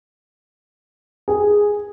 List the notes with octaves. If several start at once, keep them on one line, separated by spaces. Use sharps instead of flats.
G#4